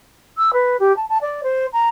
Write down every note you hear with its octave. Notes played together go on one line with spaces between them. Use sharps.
E6
B4
G4
A5
A5
D5
C5
A#5